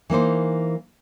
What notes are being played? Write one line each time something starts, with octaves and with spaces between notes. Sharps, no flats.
E3 A#3 D#4 C5